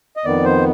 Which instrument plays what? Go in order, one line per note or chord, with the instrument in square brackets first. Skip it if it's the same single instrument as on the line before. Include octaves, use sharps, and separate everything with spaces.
[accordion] D#5
F2 D#3 B3 D5
C5